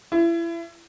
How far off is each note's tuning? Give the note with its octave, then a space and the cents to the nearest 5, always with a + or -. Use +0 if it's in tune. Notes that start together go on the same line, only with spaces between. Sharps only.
E4 +30